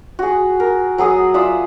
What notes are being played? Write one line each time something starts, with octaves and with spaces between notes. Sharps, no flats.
F#4 G#4
A#4
F#3 B3 G#4 D#6
F4 D5 E5 F#5